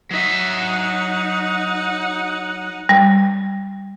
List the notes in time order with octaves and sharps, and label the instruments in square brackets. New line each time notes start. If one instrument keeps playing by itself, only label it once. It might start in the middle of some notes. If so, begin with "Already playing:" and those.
[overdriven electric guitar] F#3 E5 [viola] D#4 F#5
[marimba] G3